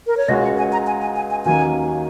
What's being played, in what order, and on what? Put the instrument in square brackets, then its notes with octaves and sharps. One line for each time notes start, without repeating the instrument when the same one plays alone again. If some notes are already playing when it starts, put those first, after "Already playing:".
[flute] A#4
C#5
[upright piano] C#2 C#3 G#3 F#4 [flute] D#5
[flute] F#5
G#5
A#5
G#5
G#5
G#5
G#5
[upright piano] D#2 D#3 F#3 A#3 C#4 [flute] G#5